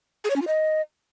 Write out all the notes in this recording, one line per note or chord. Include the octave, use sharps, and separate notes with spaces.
G#4
C#5
C#4
F4
D#5